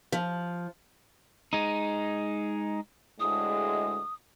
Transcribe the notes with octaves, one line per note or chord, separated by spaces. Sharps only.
F3
G#3 D#4
D2 A2 G#3 D#6